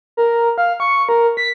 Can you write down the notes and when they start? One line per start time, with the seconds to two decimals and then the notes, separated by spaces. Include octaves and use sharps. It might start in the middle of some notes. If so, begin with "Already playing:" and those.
0.17 A#4
0.58 F5
0.80 C#6
1.09 A#4
1.37 B6